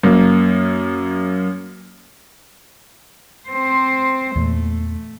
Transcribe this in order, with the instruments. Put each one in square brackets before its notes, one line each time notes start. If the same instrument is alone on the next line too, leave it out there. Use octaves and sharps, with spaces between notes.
[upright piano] F#2 A#3
[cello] C4 C5
[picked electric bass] E2 A#2 [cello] A3